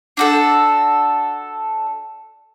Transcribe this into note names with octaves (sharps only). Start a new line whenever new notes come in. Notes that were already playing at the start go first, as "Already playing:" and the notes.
D4 F#4 A4